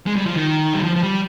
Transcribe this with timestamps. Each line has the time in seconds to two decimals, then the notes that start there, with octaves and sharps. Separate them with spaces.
0.06 G#3
0.16 G3
0.26 F3
0.35 D#3
0.74 G3
0.84 F3
0.96 F3
1.03 G3